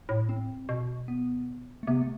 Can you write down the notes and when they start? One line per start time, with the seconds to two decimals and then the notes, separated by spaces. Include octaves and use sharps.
0.09 A2
0.29 C4
0.69 B2
1.08 B3
1.83 A3
1.87 C3 B3
2.01 A3